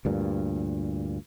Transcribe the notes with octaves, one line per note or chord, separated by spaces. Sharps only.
D2 G2 A#2